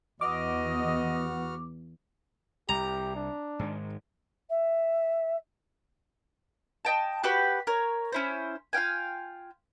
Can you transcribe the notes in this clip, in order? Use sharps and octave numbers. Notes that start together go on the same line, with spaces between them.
E2 B3 F#4 D#5 D6 F6
C2 G4 A#5
D4
G#2 D#3 G#3
E5
D#5 G5 A5
F#4 G4 B4 G5
A#4 C#5
C#4 E4 C5
F4 F5 G5 G#5